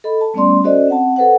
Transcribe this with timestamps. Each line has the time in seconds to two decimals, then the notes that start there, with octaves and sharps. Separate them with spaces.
0.04 A4 D#5 B5
0.21 A5
0.34 G3 A3 B3 C#4 D5 C6
0.64 C#4 F#4 A4 C5 D5 D#5
0.88 C4 F#5 A5
1.16 A4 B4 C5 F#5